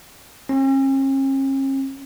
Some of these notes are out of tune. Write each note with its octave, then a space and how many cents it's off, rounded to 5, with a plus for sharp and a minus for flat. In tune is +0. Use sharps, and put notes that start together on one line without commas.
C#4 -45